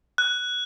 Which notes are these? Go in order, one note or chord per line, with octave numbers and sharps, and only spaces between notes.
F#6